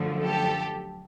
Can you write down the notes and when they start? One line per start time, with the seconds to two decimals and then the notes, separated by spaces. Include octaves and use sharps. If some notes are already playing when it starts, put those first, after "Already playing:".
Already playing: F#2 D3 F3 A3
0.22 G4 A4